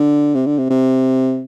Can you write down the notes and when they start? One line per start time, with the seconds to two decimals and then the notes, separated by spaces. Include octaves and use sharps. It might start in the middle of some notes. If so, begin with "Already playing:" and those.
Already playing: D3
0.35 C3
0.46 D3
0.58 C3
0.70 C3